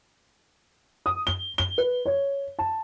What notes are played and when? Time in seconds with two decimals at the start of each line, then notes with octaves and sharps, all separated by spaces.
1.06 D#6
1.27 G7
1.58 G7
1.78 B4
2.06 C#5
2.59 A5